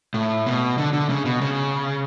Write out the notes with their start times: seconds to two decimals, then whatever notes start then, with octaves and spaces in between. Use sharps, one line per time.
0.14 A2
0.46 B2
0.78 D3
0.93 D3
1.10 C#3
1.25 B2
1.41 C#3